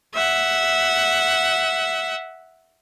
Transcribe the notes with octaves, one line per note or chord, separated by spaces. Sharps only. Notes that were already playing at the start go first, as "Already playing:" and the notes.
E5 F#5